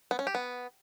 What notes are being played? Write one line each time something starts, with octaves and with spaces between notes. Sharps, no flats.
B3
C#4
G4
B3